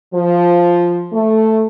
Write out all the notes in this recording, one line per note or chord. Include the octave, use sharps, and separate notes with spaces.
F3
A3